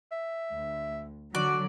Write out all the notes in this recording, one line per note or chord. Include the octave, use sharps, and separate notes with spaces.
E5
D2
D3 F#3 F#4 D5